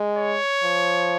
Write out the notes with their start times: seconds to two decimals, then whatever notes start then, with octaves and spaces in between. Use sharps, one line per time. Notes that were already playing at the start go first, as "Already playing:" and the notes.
Already playing: G#3
0.18 C#5
0.64 F3